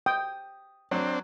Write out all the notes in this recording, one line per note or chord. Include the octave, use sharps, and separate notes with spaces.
G5 D#6
F#3 C4 D4